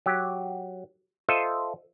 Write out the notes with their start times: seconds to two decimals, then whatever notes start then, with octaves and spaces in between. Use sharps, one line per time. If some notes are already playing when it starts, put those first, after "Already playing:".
0.06 F#3 G4
1.29 F4 A4 C5 D#5 E5